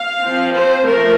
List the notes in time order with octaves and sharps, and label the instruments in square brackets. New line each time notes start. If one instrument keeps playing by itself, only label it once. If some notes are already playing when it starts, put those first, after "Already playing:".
Already playing: [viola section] F5
F3 C4
C5
F3 A3 A#4